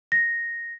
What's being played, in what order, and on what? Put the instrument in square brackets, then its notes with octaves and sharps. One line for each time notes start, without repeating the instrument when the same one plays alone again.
[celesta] A#6